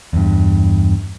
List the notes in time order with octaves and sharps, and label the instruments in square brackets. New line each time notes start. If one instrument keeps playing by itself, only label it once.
[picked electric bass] E2 G2